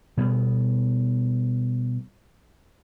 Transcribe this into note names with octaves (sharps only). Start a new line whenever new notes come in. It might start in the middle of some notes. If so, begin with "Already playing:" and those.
B2 G3 B3